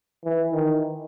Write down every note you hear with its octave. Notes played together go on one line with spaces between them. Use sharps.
E3
D#3